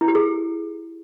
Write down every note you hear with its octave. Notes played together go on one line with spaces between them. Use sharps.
E4
G4
G#4